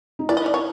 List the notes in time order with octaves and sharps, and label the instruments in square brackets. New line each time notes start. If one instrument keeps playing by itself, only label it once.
[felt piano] D#4
[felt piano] E4 [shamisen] D5
[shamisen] D#5
D5
C#5